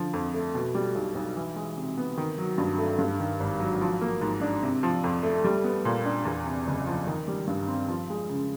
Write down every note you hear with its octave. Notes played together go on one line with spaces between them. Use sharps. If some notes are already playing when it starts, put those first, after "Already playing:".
Already playing: D3 F3
F2
A3
B2
G3
B1
B1
E3
G#3
C3
B3
D#3
F#3
G2
A3
G2
D#3
G#1
F#3
F3
A#3
G#2
D4
C3
F3
F2
A3
G3
B3
A#2
D4
E2
C3
F#1
F3
D#3
G3
G2
C4
F3
G#3
C#3